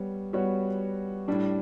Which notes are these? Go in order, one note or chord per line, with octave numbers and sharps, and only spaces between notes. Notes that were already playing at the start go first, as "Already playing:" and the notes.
Already playing: G3 B3 C#5
G3 B3 F#4 C#5
A2 G3 D4